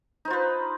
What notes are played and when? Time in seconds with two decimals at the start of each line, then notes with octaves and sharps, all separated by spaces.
0.25 D#4
0.28 C5
0.30 F4
0.33 B4